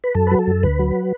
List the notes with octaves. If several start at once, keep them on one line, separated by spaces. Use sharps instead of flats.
B4
F#2 A4
F#3 B4
A4
F#2
D2 B4
F#3